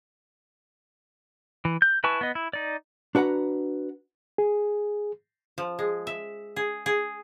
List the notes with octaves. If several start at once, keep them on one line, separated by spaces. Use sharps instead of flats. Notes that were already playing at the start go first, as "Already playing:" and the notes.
E3
G6
E4 B4 G#5 A5 C#6
B3 D#5
E4
D#4 D5
D4 F#4 B4 F#5 A#5
G#4
F3
G#3
E5
G#4
G#4